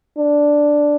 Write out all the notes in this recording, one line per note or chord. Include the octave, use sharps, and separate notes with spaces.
D4